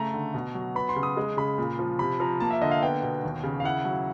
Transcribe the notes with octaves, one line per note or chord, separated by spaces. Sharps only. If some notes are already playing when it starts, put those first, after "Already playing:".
Already playing: C#3 A3 A#5
D3
B2
F#3
B3 B5
C6
C#3
D#6
G#3
C#3 B5
A#2
F3
C3 B5
F3 A#5
A#3 A5
E5
D3 D#5
F5
B3 G5
B2
D#2
C#3
F5
E4 F#5
F#3